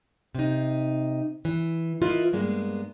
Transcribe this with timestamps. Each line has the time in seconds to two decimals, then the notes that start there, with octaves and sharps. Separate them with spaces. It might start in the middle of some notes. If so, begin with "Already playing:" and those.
0.35 C3 D#4
1.45 E3
2.02 E4 F4 A#4 B4 D#5
2.33 G2 G#3 A#3 B3